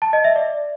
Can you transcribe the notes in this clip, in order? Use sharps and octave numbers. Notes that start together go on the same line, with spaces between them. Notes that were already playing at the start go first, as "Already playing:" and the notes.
A5
D#5
E5
D5